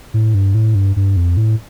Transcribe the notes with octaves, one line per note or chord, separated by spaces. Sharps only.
A2
G2
A2
G2
G2
F2
A2